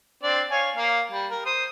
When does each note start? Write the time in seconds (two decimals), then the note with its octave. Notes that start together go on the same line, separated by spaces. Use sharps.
0.23 C4 D4 D5
0.51 C#5 F5 G#5
0.76 A#3 F5
1.12 G3
1.31 A#4
1.46 C5 D#6